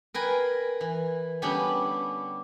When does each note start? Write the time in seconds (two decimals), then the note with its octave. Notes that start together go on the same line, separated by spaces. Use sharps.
0.14 A#4 B4 G5 G#5 C6
0.81 E3
1.42 D3 G3 B3 C#4 D4 G4